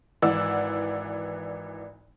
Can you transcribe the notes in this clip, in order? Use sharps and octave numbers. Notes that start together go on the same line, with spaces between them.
G#1 E3 D5 F#5 E6